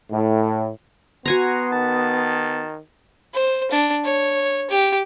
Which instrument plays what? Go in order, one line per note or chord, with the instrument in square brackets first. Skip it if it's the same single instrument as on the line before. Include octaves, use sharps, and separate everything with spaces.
[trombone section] A2
[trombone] B3 [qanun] F#4 G#5 A#5 [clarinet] C6
[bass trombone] D#3 [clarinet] A5
[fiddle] C5
D4
C#5
G4